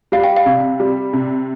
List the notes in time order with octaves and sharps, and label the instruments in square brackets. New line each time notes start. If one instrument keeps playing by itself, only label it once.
[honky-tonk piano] G3 [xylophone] F5
[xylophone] G5
F5
[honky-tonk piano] C3
G3
C3